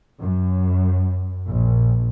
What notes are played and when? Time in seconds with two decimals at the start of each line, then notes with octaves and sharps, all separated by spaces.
0.20 F#2
1.48 A#1